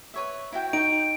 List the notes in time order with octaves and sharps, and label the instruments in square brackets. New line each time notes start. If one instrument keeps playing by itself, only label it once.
[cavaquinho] B4 C#5 E5
E4 F#4 G5
[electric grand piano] D#4 [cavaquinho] D#5 G5 C#6 [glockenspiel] D7